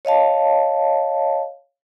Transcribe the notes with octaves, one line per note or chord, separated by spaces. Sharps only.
C#5 D#5 F5 A5